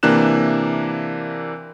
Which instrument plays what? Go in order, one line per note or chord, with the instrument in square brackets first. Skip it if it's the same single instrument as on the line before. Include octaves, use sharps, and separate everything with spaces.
[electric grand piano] C3 E3 A#3 D4 F#6 E7